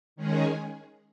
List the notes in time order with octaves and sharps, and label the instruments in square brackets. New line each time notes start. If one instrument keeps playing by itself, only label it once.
[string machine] D#3 G#3 C#4 G#4